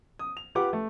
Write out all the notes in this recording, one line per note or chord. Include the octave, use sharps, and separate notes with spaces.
D#6
F7
F4 G4 B4 F#5 D6
A3